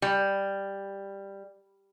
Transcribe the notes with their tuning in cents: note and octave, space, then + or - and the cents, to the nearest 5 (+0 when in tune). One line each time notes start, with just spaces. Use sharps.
G3 +5